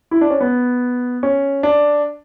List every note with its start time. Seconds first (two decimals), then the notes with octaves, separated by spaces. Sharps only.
0.11 E4
0.21 D4
0.30 C#4
0.41 B3
1.23 C#4
1.63 D4